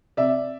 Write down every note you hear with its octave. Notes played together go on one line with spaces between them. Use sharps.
C3 D5 E5